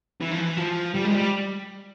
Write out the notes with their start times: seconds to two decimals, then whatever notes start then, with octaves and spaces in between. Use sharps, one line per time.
0.21 E3
0.32 F3
0.41 E3
0.58 F3
0.95 G3
1.05 G#3
1.15 G3